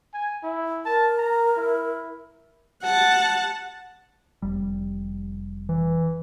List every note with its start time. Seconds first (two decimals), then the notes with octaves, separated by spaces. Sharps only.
0.14 G#5
0.43 E4
0.86 A#4 A5
1.18 A#5
1.56 E4
2.83 F#5 A5
4.42 F1 G3
5.69 E3